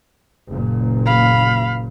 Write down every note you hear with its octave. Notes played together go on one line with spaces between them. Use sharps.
F#1 A#2
F5 B5